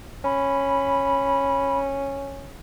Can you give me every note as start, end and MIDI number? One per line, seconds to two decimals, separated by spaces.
0.25 2.57 61
0.25 1.78 83